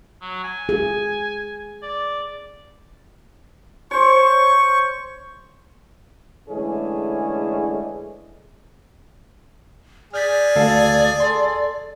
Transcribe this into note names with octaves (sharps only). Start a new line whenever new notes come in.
F#3
G#5
G#4
D5
C5 C#5 C#6
D3 E3 G#3 A3 C#4 G#4
G#4 D5 F6 G6 B6
D2 A4 F5
A4 C6